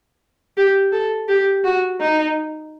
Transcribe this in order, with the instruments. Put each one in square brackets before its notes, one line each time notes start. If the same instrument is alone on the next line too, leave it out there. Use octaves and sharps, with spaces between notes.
[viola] G4
A4
G4
F#4
D#4